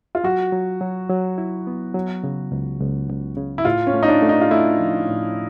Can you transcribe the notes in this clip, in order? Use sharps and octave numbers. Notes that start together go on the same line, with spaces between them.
F4
F#3 F#4
F#3
F#3
F#3
E4
B3
F#3
C#3
C#2
C#2
C#2
C#3
E4
A2 F4
C#4
A3
D#4
D4
A3
D#4
F4
A3 E4
F3
A2